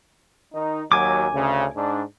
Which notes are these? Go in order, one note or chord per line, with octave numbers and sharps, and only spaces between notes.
D#3 D#4
D#2 F#3 G#5 D6
D2 C#3
G#2 D4